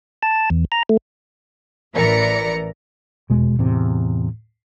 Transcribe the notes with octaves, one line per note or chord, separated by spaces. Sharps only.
A5
E2
A#5
A3
A1 E3 A#4 D5 A#5 C#7
F1 E2 B2 G#3
E2 A2 C3